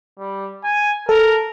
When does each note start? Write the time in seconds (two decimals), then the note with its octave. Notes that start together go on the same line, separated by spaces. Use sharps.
0.19 G3
0.64 G#5
1.09 A4 A#4